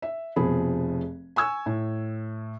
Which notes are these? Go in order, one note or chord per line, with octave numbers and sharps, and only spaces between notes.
E5
F1 B2 F3 G#4 B5
G#5 C#6 E6 G#6
A2